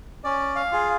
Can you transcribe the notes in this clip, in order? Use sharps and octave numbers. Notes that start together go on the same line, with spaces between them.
C#4 D5
F5
F4 G#4